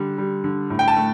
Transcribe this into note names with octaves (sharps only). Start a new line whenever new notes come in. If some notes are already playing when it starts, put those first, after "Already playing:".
Already playing: D3 G3
G3
D3
A2
G5
A5
A3